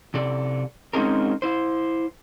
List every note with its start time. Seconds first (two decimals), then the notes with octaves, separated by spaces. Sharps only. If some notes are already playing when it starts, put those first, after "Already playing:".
0.14 C3 A4 D5
0.93 G#3 C4 C#4 D#4 G#4 A#4
1.42 E4 C5